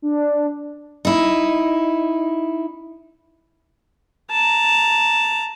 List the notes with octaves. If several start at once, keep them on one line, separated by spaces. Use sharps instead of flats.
D4
D#4 E4
A5 A#5